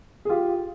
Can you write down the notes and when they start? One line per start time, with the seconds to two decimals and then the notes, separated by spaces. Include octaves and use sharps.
0.25 G#4
0.29 F4 G4